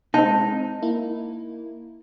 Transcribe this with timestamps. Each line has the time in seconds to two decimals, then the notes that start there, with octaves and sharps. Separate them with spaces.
0.14 G#3 C4 D#4 A5
0.83 A#3 E4